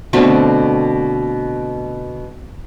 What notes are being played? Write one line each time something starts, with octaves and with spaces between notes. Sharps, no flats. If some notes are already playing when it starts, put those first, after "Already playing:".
B2 D3 A3 C4